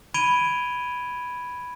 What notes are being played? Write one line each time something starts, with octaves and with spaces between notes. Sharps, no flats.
B5 G#6 D7 D#7 F7 G7